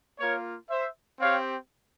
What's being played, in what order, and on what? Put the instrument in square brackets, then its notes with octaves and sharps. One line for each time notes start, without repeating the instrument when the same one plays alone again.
[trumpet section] A#3 F4 A#4 C#5
C5 E5
C4 G4 C#5 F5